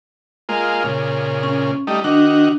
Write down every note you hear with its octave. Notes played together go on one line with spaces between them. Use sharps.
G#3 A#3 F4
A#2 C#3
C#4
G3 A3 D#4
D#3 D4 F#4